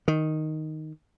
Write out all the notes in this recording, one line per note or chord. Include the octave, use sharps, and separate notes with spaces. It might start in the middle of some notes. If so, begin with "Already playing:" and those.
D#3